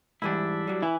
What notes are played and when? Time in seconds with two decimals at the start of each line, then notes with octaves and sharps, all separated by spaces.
0.22 G#2 E3 G3 D4 E4
0.67 F#3 G3
0.83 E3 E4